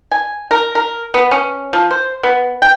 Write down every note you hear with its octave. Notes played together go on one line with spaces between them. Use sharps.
G#5
A#4
A#4
B3
C#4
F3
C5
B3
G5